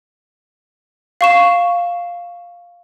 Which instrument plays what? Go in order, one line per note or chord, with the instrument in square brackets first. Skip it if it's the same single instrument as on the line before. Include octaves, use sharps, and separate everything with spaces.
[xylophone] F5 C#6 E7